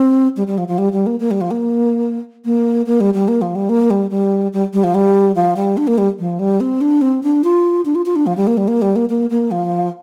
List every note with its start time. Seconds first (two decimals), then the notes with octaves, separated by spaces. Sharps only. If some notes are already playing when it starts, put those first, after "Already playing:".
Already playing: C4
0.37 G3
0.47 G3
0.58 F3
0.68 F3
0.78 G3
0.93 G3
1.06 A#3
1.20 A#3
1.31 G3
1.41 F3
1.51 A#3
2.45 A#3
2.86 A#3
3.00 G3
3.14 G3
3.28 A#3
3.42 F3
3.55 G3
3.69 A#3
3.90 G3
4.10 G3
4.53 G3
4.73 G3
4.84 F3
4.95 G3
5.35 F3
5.56 G3
5.77 D4
5.87 A#3
5.98 G3
6.19 F3
6.39 G3
6.60 C4
6.81 D4
7.01 C4
7.23 D4
7.44 F4
7.85 D4
7.95 F4
8.06 F4
8.16 D4
8.26 F3
8.37 G3
8.47 A#3
8.57 G3
8.68 A#3
8.82 G3
8.96 A#3
9.09 A#3
9.30 A#3
9.51 F3